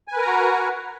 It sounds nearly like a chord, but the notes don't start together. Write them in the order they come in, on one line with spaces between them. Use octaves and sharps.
G#5 B4 A#4 A#5 F#4